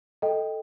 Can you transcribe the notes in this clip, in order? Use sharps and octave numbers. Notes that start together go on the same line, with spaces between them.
A4 D#5 G5